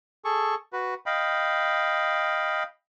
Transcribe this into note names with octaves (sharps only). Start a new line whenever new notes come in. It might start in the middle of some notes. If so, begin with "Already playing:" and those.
G#4 A4 C#6
F#4 B4
D#5 F5 G5 B5